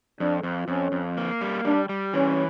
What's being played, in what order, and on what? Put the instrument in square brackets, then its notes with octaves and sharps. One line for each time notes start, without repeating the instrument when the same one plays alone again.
[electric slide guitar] F2 [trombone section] D4
[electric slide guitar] F2
[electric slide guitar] F2 [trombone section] C#4
[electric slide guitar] F2
A#3
G3
[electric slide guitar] G3 [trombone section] D4
[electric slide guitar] G3
[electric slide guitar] E3 [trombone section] C#4